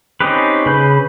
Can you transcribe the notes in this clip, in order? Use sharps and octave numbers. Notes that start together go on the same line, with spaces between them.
C4 C#4 D#4 G4 B4
C#3 B4 B5 G6